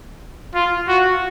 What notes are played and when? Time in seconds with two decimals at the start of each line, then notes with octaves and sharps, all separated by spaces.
0.55 F4
0.88 F#4